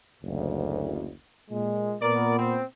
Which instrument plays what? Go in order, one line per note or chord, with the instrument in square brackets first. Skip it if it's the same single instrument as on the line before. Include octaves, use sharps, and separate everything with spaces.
[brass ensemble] F#1 D2
A#2 G#3
[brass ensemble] A#2 B3 [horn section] A#4 D5
[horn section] C4